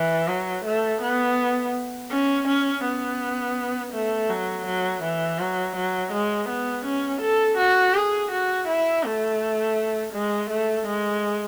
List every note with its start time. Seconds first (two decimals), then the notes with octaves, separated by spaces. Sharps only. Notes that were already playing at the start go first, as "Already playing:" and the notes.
Already playing: E3
0.28 F#3
0.65 A3
1.01 B3
2.11 C#4
2.47 C#4
2.84 B3
3.93 A3
4.29 F#3
4.66 F#3
5.03 E3
5.39 F#3
5.76 F#3
6.12 G#3
6.49 B3
6.85 C#4
7.21 A4
7.58 F#4
7.94 G#4
8.31 F#4
8.67 E4
9.03 A3
10.13 G#3
10.49 A3
10.87 G#3